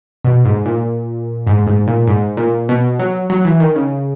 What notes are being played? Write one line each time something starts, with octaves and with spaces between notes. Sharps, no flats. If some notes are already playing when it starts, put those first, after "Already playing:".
B2
G#2
A#2
G#2
G#2
A#2
G#2
A#2
B2
F#3
F#3
E3
D#3
C#3